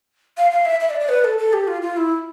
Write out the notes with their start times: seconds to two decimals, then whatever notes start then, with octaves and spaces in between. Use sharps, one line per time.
0.37 F5
0.51 F5
0.65 E5
0.80 E5
0.90 D5
1.00 D5
1.09 B4
1.24 A4
1.38 A4
1.53 G4
1.68 F4
1.82 F4
1.97 E4